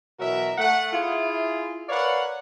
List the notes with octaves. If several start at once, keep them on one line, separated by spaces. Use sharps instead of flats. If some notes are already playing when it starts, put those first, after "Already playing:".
B2 E3 F#3 F#4 A#4 E5
A3 F#5
E4 F4 G#4
A#4 B4 C#5 D5 F5 F#5